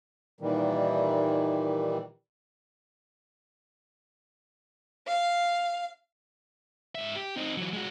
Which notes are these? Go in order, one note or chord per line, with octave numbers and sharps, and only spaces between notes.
A#2 D#3 E3 G3
F5
G#2 E5
G4
C4 D#4
E3 F#3
G#3 F#4